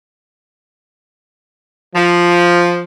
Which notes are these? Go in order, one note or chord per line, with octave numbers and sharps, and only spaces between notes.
F3